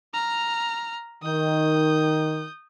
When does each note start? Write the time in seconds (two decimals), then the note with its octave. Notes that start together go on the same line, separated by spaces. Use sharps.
0.14 A#5 F6
1.23 D#3 D#6 G6